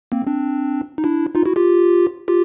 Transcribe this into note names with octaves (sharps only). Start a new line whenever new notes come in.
A#3 C4
C4 D4
D#4
D4 E4
D#4 F4
E4 F#4
F4 G4
F4 G4